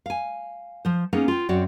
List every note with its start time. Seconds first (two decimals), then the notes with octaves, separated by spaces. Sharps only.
0.06 F5 G#5
0.85 F3 C5
1.13 A#3 B3 C#4 D#4 G#4
1.28 F4 G5
1.49 F#2 C4 F#4 C#5 D5